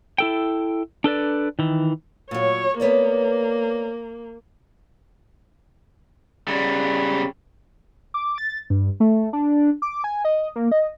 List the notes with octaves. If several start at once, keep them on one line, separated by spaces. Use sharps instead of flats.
E4 A4 G5
D4 A4 B4 D5
D#3 E3
A#2 F#3 C#5
A#3 B3 C#5 D5
C#3 G3
D6
A6
G2
A3
D4
D6
G#5
D#5
A#3
D#5